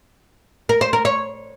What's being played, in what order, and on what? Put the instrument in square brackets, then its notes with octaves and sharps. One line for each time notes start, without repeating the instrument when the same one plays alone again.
[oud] A#4
C5
A#4
C#5